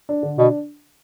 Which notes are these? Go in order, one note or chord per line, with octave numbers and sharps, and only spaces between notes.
D4
D3
B2 D4